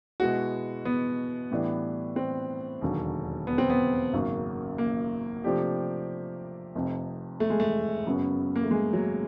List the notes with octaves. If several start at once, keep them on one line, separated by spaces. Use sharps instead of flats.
B2 G#3 B3 E4 F#4
B3
A2 E3 G3 B3 D4
C4
E1 D#2 D3 F#3
B3
C4
B3
G#1 F#2 C#3 F#3 A#3
A#3
C3 F3 A3 D4 G4
F1 F2 C3
A3
G#3
A3
F#1 F#2 C#3 F#3 B3
A#3
A3
G#3
F#3